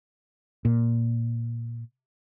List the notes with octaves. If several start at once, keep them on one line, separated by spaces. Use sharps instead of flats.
A#2